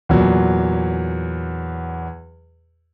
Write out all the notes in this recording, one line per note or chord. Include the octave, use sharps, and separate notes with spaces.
E2 A#2 F#3